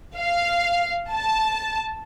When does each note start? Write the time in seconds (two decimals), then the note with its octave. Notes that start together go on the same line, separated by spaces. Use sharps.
0.17 F5
1.11 A5